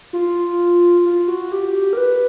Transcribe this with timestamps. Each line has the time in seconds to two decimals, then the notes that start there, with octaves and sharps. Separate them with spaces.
0.13 F4
1.06 F4
1.28 F#4
1.52 G4
1.93 A#4
1.97 B4